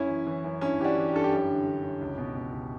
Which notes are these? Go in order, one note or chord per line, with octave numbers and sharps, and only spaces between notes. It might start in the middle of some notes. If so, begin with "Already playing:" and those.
Already playing: F#2 C#4 E4
E3
E3 C#4
F#2
G2 C#4 E4
E3 D4 F#4 G4
E3
G4
G2 A4
E4 G4
F#2
D3
D3
F#2
C#2
B2
B2
C#2